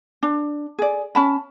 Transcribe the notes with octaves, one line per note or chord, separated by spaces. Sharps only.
D4
G#4 D5
C#4 A5 B5